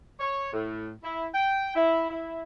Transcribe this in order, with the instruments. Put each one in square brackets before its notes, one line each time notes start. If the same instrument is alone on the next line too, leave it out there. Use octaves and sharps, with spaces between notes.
[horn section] C#5
A2
E4
G5
E4
E4